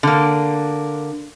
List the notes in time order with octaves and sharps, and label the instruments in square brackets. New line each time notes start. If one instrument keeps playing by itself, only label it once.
[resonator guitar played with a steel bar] D3 A#3